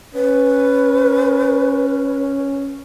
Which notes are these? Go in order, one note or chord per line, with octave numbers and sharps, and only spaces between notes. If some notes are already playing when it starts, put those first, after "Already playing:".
C#4 B4